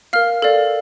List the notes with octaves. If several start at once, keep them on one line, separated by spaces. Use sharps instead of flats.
A#4 F5 F6
A4 D5 F5